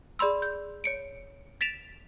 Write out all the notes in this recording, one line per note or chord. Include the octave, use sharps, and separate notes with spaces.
G#4 D5 B5 C6 E6
G6
C#5 C#7 D7
A6 B6 D7 E7 F7